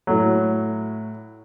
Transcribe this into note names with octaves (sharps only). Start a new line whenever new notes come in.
A2 F#3 A3